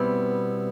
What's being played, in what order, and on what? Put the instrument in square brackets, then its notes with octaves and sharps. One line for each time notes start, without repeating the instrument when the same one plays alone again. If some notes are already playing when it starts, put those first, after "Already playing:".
Already playing: [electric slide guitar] B2 G3 C4 E4 [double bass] B3